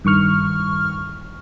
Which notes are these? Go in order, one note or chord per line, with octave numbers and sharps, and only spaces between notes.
G2 D#3 C#6 F6